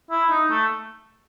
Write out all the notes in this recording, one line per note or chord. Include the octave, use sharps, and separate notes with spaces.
E4
D#4
A3